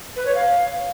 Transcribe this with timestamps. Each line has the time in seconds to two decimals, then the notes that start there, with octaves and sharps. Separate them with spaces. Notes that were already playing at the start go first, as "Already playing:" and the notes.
0.16 B4
0.26 C#5
0.35 F5